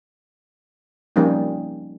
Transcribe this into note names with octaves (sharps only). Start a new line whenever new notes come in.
F3 G3 A#3 C#4 D#4